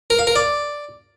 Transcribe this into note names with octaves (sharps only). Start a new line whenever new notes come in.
A#4
F5
A#4
D5